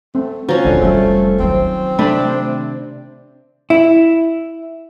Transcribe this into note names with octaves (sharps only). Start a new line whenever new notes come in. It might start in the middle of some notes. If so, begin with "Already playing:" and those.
A3 C4
F3 C#4 F#4 A#5
D#1 D3 C4
F1 G3 A3
D#3 F#3 C4
C3 A3 D4 C5 B5
E4